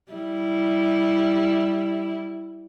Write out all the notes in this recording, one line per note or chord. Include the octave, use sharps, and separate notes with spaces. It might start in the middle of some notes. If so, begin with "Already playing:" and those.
G3 E4